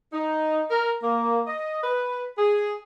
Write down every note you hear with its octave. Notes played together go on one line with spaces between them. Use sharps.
D#4
A#4
A#3
D#5
B4
G#4